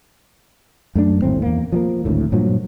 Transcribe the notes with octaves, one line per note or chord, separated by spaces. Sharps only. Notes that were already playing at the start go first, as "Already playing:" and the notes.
F#2 A3 D4
D#1 G#1 A2 C4
E2 A#3
F3 F#3 A#3
G#1 D2 A2
G2 A#2 F3 F#3